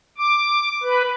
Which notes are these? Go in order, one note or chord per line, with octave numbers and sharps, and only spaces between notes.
D6
B4